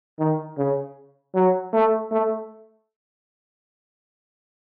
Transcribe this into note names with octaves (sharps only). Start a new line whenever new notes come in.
D#3
C#3
F#3
A3
A3